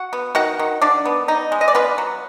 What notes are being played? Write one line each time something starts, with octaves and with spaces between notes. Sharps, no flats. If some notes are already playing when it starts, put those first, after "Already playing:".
Already playing: F#4 F#5
B3
D#3 F#4 F#5
D#3
F3 D4 D5
B3
D#4
G#3
D#5
D5
B3 F4 B4
F#3